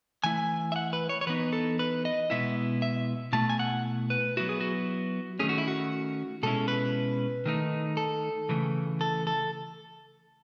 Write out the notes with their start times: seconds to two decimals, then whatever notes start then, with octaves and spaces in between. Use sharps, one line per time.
0.24 E3 A3 E4 G#5
0.72 E5
0.76 F#5
0.93 B4
1.09 C#5
1.21 C#5
1.27 E3 B3 D#4 B4
1.53 A4
1.79 B4
2.05 D#5
2.30 B2 G#3 B3 E4 E5
2.82 E5
3.33 B2 A3 E4 A5
3.50 G#5
3.59 F#5
4.10 B4
4.37 F#3 B3 E4 F#4
4.49 G#4
4.61 F#4
5.39 D#3 A3 C#4 G#4
5.49 F#4
5.58 E4
5.68 F#4
6.43 B2 G#3 C#4 E4 A4
6.68 B4
7.46 D#3 A3 D#4
7.97 A4
8.49 C#3 E3 A3
9.01 A4
9.27 A4